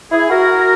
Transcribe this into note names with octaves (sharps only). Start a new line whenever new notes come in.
E4 G#4
F#4 A#4